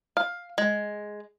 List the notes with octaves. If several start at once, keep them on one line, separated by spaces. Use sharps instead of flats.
F5
G#3